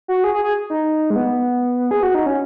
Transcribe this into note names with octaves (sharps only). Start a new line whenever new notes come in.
F#4
G#4
G#4
G#4
D#4
G#3
B3
G#4
F#4
D#4
C#4